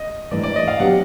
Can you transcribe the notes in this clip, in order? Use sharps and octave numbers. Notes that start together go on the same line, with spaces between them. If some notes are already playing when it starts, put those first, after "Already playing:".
Already playing: D#5
G#2 E3 A3 D4 D5
D5
D#5
F5
F#3 B3 D4 G4 F#5